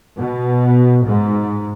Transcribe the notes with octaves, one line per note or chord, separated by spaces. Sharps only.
B2
G#2